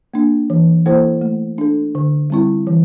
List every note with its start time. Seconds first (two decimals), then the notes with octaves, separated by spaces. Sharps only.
0.14 A#3 D4
0.50 E3
0.86 A#3 E4 A4 C5
1.21 A3
1.58 D4 A4
1.95 D3
2.30 G3 C4 E4
2.67 E3